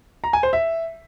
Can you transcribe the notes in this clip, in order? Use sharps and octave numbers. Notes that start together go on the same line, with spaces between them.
A#5
G#5
C5
E5